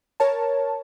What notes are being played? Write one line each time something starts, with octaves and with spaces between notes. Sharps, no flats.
A#4 C#5 A5